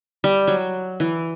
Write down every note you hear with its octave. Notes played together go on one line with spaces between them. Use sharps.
G3
F#3
E3